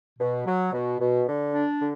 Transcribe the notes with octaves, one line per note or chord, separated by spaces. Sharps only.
B2
F#3
B2
B2
D3
D4
D3